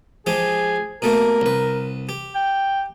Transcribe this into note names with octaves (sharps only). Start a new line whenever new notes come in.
F3 G#3 G4 G#4
B2 A3 A#3 A#4
C2 B4
G4
G5